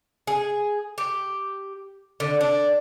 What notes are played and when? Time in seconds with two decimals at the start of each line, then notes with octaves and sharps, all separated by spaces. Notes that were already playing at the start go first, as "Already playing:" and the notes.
0.27 G#4
0.98 G4
2.20 D3
2.41 D4